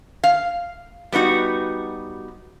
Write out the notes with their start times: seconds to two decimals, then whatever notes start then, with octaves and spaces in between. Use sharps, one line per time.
0.24 F5
1.12 G3 B3 D#4 F#4